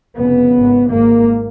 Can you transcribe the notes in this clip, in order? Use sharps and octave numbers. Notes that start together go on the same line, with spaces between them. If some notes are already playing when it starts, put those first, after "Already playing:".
F1 F2 C#3 B3
G#1 G#2
G#1 G#2 A#3